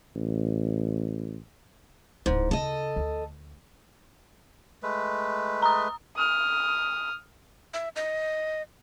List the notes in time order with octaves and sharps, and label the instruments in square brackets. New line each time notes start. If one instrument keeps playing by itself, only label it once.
[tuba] A1
[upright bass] D1 D4 [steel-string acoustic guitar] G#2
[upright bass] C#3 [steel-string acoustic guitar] A4 D#5
[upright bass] D2
[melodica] G#3 A3 B4
[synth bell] A#5 D#6
[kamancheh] D#6 F6
[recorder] E5
D#5